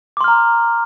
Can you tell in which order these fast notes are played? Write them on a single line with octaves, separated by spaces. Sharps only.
D6 C6 F6 A#5